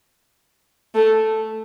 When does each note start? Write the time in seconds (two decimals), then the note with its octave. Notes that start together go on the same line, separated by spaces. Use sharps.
0.94 A3